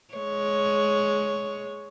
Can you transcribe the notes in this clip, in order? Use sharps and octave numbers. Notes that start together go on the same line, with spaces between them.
G#3 C#5